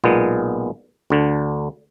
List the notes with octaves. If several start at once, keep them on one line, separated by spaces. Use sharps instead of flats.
B1 A#2 G#3 B3
D2 D3